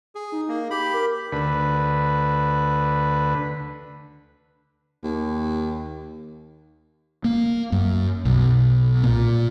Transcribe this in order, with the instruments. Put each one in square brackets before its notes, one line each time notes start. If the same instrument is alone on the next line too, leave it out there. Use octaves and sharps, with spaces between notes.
[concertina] G#4
[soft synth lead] D#4
[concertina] A#3
[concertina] G4 B5 [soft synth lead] D6
[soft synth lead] A#4
[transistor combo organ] D2 B4
[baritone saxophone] D#2
[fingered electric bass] A#3
F#2
B1
A#2